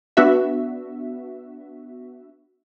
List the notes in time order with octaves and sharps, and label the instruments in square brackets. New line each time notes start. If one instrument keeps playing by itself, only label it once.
[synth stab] B3 D4 F#4 E5